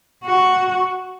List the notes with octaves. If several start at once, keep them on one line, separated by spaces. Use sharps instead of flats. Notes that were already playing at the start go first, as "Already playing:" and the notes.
F#4